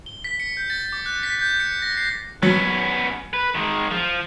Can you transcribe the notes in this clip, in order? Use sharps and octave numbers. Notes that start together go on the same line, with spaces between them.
G7
B6
C#7
G6
A6
D6
F#6
B6
G6
C#7
A#6
C7
F#3 B3 C#4
B4
D#3 G#3
F3